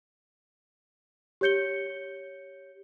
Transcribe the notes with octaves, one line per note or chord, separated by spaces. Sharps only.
G4 C#5 G6 C#7 G7